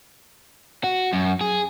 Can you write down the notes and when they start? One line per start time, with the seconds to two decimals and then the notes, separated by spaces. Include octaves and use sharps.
0.84 F#4
1.13 F#2
1.41 G#4